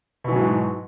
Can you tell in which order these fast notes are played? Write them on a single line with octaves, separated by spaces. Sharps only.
B2 E3 F#3 G#2